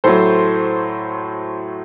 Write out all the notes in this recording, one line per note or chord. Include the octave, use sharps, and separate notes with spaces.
A2 F#3 A3 A4 C5